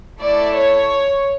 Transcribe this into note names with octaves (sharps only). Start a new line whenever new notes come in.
A3 E4 A4 D5
C#5